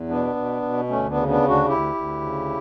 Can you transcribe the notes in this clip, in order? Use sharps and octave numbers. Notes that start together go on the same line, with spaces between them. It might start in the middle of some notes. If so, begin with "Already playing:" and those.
Already playing: E2
B2 B3 D4
B2
B2
D2 A3 C#4
B3 D4
C#3
B3 D4
D2
D4 F#4
D2 E4 G4
D2
C#3